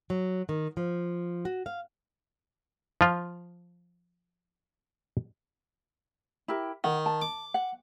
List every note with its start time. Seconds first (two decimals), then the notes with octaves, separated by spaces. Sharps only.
0.10 F#3
0.49 D#3
0.77 F3
1.45 F#4
1.66 F5
3.01 F3 F4
6.48 E4 G4 A#4
6.84 D#3 F#5
7.06 A5
7.22 D6
7.54 F#5